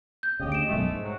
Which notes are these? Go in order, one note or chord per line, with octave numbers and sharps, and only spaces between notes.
G6
D2 C#3 G4 D#5
D7 E7
B1 F#2 G#3 A3
G#2
C3 F#3 F#4